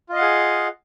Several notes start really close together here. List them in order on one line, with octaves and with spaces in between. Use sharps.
F4 D#5 F5 F#5 G#4